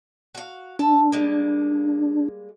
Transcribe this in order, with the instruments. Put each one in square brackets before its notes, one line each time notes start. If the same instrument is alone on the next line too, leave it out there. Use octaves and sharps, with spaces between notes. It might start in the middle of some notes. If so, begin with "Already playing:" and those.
[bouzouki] F#4 F5
[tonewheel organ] D4 [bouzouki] A4
[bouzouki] G3 G#3 A#3